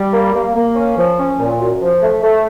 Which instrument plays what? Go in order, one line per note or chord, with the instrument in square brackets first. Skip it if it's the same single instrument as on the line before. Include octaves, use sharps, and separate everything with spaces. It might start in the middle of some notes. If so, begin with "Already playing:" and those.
Already playing: [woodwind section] G3
A#3
A#3
A#3
C#4
F3
C#4
A#2
F#2
F3
A3
A3